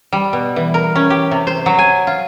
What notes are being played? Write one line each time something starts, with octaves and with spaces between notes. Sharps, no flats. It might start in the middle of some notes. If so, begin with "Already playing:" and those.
G3
B2
E3
A#4
C#4
G4
C3
C5
F#3
G#5
F4